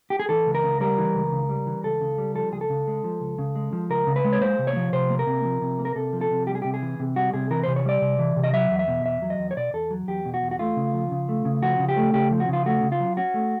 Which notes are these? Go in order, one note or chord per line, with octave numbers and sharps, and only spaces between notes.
G4
G#4
E3 A4
C#2
A#4
C#3
G3 A#4
E3
C#2
C#3
G3
E3
C#2 A4
C#3
G3
F3 A4
C#2 G#4
A4
C#3
G#3
F3
C#2
C#3
G#3
F3
C#2 A#4
C#3
B4
G#3
C#5
A#3 C5
C3
C#5
F3
C3 C5
A#3
A#4
C3
F3
C3
A#3
A#4
C3 A4
F3
A4
C3
G3 G4
G#4
C3 G4
G#4
E3
C3
G3 F#4
C3 G#4
E3 A#4
C3 C5
C#5
G3 D5
C3
E3
C3
D#5
F#3 E5
E2
E5
B2
E2 E5
F#3
D#5
E2
C#5
B2 D5
E2 A4
F#3
E2 G4
B2
F#4
E2
F#4
A3 F4
C#3
F3
C#3
A3
C#3
F3 F#4
C#3
G4
A3
C#3 G4
F3
F#4
C#3 F4
A3 F#4
C#3
F4
F#3
C#4 F#4
A3